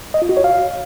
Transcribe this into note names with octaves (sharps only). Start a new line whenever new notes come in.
D#5
F4
F#4
C#5
F5